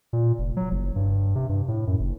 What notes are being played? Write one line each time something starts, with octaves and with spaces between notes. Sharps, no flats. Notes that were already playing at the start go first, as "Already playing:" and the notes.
A#2
F1
F#3
F#1
G2
C3
G2
A2
F#2
F#1